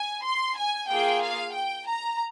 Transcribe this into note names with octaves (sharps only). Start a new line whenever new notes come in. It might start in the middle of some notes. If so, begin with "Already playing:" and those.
Already playing: G#5
C6
G#5
A#3 F4 G#4 G5
F5
G5
A#5